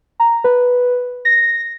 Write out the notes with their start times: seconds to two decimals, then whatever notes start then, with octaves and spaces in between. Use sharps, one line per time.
0.20 A#5
0.44 B4
1.25 A#6